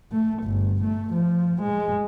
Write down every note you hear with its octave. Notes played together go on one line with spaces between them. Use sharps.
A3
G1
A3
F3
G#3